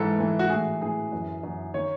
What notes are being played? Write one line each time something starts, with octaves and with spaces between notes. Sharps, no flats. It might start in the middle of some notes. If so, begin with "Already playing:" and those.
Already playing: G#2 E3 A4
G#2 E3
F#4
A2 E3 G#4
A2 E3 G#4
F#2 E3
F#2 E3
D#3 C#5